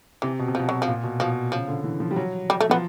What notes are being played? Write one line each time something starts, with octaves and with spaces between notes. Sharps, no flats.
C3 E3
B2
C3
B2 F3
F#3
F3
A#2
B2
B2 F3
C#3 F3
D3
E3
F3
G3
F#3
G3
A3
F3 B3